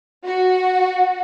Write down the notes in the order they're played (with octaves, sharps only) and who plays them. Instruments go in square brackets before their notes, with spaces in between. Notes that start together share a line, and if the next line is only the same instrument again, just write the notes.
[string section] F#4